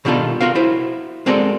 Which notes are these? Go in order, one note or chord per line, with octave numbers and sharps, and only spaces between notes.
B2 D#3 G3 D4 F4 A4
F4 F#4 A#4 F5
E4 F#4 C5
G#3 C4 F#4 A4 A#4 D5